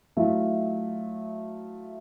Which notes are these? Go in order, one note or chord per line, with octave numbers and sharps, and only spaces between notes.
F#3 A3 E4 F4